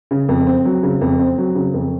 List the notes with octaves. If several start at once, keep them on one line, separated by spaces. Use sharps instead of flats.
C#3
F2
C4
F#3
C#3
F2
C4
F#3
C#3
F2